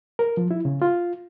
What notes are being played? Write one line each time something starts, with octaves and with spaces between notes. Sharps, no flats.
A#4
F3
E4
C#3
F4